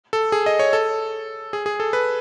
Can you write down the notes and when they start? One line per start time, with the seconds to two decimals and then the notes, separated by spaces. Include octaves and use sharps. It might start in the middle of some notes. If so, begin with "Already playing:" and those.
0.13 A4
0.32 G#4
0.46 D#5
0.59 C#5
0.73 A4
1.53 G#4
1.66 G#4
1.80 A4
1.93 B4